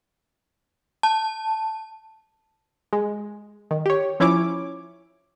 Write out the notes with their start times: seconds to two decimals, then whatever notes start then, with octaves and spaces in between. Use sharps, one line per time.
1.03 A5
2.93 G#3
3.71 D#3
3.86 G4 C#5
4.20 F3 C#4 E4 C#5 D6